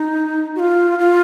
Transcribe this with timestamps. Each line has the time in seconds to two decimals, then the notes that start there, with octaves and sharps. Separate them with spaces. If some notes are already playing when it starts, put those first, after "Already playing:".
Already playing: D#4
0.55 F#4
0.59 F4
0.99 F4